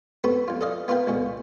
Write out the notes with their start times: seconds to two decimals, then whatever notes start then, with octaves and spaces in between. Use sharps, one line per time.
0.24 B3 C4 F#4 A4 B4
0.48 F2 F4
0.61 A4 D5 D#5 F5
0.88 B3 F4 A#4 B4 F5 G5
1.07 C#2 B2 D3